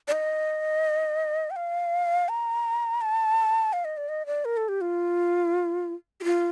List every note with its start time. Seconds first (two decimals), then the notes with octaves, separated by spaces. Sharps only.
0.08 D5
0.12 D#5
1.50 G5
1.56 F5
2.29 A#5
3.01 A5
3.73 F5
3.85 D#5
3.97 D5
4.09 D#5
4.26 D5
4.45 A#4
4.57 A4
4.69 G4
4.81 F4
6.21 G4
6.24 F4